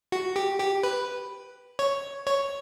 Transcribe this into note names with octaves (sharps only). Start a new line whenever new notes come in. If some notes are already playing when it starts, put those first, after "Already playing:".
F#4
G4
G4
B4
C#5
C#5